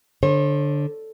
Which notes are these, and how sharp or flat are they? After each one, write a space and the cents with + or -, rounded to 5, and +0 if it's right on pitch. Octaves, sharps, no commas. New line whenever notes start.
D3 +0 C#5 -45